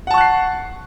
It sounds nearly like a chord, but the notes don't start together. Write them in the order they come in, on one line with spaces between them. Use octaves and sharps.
F#5 A5 C#6 F#6 C7